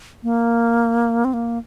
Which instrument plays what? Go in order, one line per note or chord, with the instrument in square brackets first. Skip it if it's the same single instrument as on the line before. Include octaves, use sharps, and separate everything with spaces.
[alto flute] A#3
C4
A#3